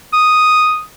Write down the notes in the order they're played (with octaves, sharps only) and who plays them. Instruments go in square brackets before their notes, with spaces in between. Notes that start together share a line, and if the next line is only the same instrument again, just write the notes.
[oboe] D#6